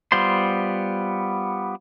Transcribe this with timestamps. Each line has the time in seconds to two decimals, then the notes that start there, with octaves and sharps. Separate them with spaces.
0.12 G3 B3 F4 C5 C6